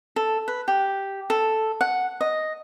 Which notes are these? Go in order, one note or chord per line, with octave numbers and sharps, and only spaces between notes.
A4
B4
G4
A4
F#5
D#5